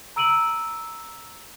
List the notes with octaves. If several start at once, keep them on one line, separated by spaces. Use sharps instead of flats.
A#5 E6 D7 D#7 F#7